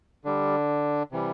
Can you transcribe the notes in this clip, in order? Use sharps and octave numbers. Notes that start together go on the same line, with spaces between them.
D3 G3 D4
C3 E3 G3